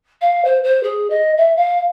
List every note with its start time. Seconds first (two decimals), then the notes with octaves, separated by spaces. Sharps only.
0.21 F5
0.45 C5
0.64 C5
0.83 G#4
1.10 D#5
1.37 E5
1.56 F5